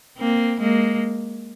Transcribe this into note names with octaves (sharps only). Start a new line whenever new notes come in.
A#3 C4
G#3 A#3